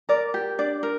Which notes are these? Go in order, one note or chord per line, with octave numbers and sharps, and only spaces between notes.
A#4 D5
G4
D4 D5
A#4